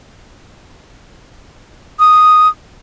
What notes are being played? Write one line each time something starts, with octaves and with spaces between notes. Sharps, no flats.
D#6